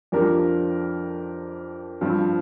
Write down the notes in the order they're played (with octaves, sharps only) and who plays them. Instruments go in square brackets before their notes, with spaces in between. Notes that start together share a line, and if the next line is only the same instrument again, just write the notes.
[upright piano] F2 F3 D4 G4 A#4
G2 F3 C4